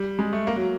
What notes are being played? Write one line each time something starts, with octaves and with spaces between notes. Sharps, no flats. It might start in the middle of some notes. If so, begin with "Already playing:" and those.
Already playing: G3
G#3
A3
A#3
F#3